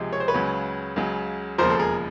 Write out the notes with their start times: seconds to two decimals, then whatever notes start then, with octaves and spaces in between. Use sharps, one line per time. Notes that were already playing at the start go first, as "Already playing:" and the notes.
Already playing: C#2 C3 F3 G#3
0.12 C#5
0.20 C5
0.28 B4 C#5
0.34 C#2 C#3 F#3
0.96 C#2 C#3 F#3
1.58 E1 D#2 C#3 F3 A#4 C5
1.70 A4
1.79 G#4 A#4